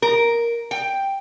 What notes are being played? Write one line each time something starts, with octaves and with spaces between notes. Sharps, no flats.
A#4
G5